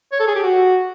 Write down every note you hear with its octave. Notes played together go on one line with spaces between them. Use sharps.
C#5
A4
G#4
G4
F#4